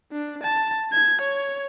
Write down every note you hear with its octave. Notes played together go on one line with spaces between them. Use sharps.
D4
A5
G#6
C#5